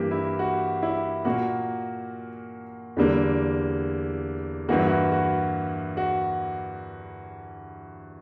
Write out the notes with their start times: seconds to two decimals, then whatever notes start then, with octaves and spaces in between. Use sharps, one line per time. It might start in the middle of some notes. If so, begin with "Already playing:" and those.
Already playing: G2 E3 A#3 G4
0.11 E4
0.39 F#4
0.83 E4
1.25 A#2 A#3 F#4
2.97 E2 D3 G3 A#3
4.69 G2 E3 A#3 F#4
4.79 E4
4.87 F#4
5.11 F#4
5.97 F#4